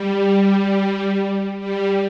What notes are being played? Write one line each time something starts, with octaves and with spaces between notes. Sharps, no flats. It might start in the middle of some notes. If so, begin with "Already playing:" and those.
Already playing: G3
G3
G3